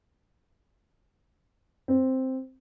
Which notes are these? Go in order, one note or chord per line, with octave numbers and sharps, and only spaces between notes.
C4